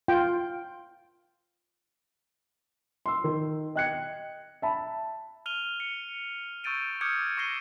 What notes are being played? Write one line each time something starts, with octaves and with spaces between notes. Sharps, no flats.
F4 G5
C6 E6
D#3
D#5 G5 F#6 G#6 C#7
E5 A5 B5
F6 D#7 F7 G7
C#7
C#6 E6 G6 A6 D7 D#7
D6 D#6 F6 G6 G#6 C#7
C#6 E6 A#6 C7 D#7 G7